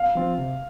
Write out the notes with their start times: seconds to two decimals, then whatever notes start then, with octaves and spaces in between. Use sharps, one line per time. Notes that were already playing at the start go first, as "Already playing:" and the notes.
Already playing: F5
0.15 F3 C4 F4
0.38 C3